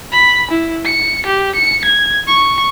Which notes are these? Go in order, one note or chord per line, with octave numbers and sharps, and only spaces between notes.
B5
E4
C#7
G4
C#7
G#6
C#6